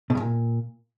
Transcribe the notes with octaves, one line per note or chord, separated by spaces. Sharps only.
B2
G2
A#2